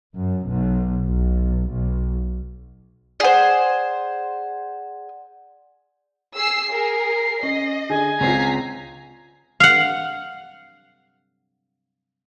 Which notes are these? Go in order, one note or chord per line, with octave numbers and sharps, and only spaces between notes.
F#2
B1
B1
B1
G#4 C5 D5 F#5
G#4 E6 C7
G#4 A#4 C7
C#4 D#5
D3 G#4 G#5
C#2 C4 F4 A#5 B6 C7
F5 F#5